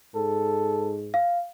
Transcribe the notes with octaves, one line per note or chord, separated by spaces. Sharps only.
G#2 A4
F5